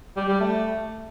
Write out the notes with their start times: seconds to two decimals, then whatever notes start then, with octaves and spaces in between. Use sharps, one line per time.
0.17 G3
0.28 G3
0.40 A3